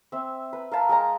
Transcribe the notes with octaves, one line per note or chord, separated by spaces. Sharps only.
C4 E5
B4
A#4 F5 A5 B5
G#3 G5 A5 A#5